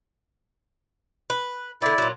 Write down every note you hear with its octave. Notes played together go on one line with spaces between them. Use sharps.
B4
D3 B3 E4 D5
A#2 F#3